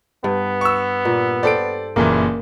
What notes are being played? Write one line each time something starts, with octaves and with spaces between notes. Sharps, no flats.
G2 B3
C#6 E6
A#2
A4 C5 D5 G5 D7
F#1 A#2 E3 A#3